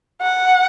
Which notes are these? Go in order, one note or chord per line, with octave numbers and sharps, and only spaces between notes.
F#5